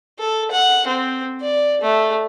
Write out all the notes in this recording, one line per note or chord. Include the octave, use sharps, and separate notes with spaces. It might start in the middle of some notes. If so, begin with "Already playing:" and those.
A4
F#5
C4
D5
A3